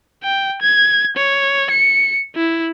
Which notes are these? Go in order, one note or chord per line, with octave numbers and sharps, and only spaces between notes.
G5
G#6
C#5
C#7
E4